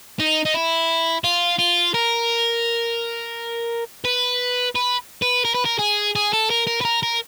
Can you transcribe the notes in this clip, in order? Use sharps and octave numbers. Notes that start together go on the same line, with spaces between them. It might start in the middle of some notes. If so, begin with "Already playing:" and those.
D#4
D#4
E4
F4
F4
A#4
B4
B4
B4
A#4
B4
A#4
G#4
G#4
A4
A#4
A#4
B4
A#4
A#4